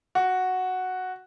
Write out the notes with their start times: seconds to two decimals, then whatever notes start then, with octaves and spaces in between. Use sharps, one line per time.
0.15 F#4